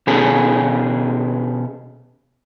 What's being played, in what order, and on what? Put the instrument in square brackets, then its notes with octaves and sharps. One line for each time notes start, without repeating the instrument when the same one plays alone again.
[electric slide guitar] B2 B3 C#4 G#4 A4